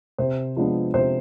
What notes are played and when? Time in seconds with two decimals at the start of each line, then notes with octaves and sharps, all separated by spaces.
0.18 C3 C5
0.57 F3 G#3 B3 D4
0.94 C3 C5